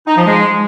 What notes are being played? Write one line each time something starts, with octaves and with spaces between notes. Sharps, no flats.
D#4
F3
G#3